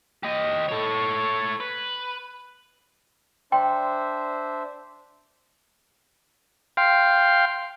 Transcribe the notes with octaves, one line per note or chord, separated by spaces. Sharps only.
G4 D#5
A4 C#5
B4
D4 C5 E5 G5 C6
F5 G5 C6